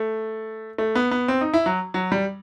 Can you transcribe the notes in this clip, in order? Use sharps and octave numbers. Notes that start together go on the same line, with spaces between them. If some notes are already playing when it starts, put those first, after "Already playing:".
Already playing: A3
A3
B3
B3
C4
D#4
E4
F#3
F#3
G3